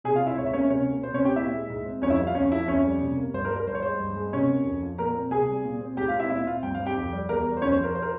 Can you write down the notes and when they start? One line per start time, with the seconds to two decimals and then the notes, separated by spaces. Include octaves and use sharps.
0.04 C3 G#4 G#5
0.16 F4 F5
0.21 C4
0.27 E4 E5
0.38 G#2 C#5
0.46 E5
0.53 A#3 C#4 C#5
0.70 C3 C#4 C#5
0.87 A#3
1.03 C3 C5
1.14 C#4 C#5
1.19 C4
1.25 G4 G5
1.36 A#2 E4 E5
1.53 G#3
1.70 G#2
1.86 C4
2.02 F2 C#4 C#5
2.10 E4 E5
2.19 G3
2.27 F4 F5
2.35 F2 C#4 C#5
2.52 F3 E4 E5
2.68 F2 C#4 C#5
2.84 G3
3.01 C3
3.17 A#3
3.34 G2 C5
3.45 A#4
3.50 G3
3.56 A#4
3.67 G2 C5
3.75 C#5
3.82 G#3 C5
4.00 G2
4.16 G#3
4.33 C3 C#4 C#5
4.49 A#3
4.65 F2
4.83 F3
4.98 A#2 A#4 A#5
5.15 C4
5.31 C3 G#4 G#5
5.48 G3
5.64 A#2
5.81 C4
5.97 G#2 G4 G5
6.08 F4 F5
6.14 C4
6.19 E4 E5
6.30 A#2 E4 E5
6.47 C4 F4 F5
6.63 G2 G5
6.74 F5
6.80 C4
6.86 G4 G5
6.97 F2
7.12 G3
7.29 E2 A#4 A#5
7.46 G3
7.57 C5
7.62 F2 C#4 C#5
7.73 C5
7.79 F3 A#4
7.95 C5
8.02 A#4